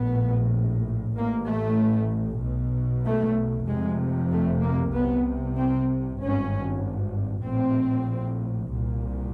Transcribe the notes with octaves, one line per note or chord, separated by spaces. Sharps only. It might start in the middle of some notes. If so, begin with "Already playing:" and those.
Already playing: A#1 A2 B3
A1 A2 A#3
A3
B1 B2
A3
F1 F2 C3 G#3
A3
A#3
C2 C3 B3
C4
G#1 G2 C#4
A#1 A2 C4
C2 A#2